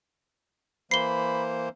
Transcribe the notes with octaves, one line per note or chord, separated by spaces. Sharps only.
E3 A#3 C5 B5 C7 G7